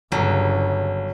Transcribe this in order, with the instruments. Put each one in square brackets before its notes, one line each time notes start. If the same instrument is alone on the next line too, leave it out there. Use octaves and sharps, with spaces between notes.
[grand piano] G1 [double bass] G2 C#3 [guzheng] F#3